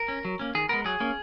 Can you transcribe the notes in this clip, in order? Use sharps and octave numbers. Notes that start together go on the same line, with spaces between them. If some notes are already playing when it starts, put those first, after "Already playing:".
Already playing: A#4
C#4
F#3
A#3 C#4
D#3 G#4
G#3 B3 A#4
F#3 G#4
A#3 C#4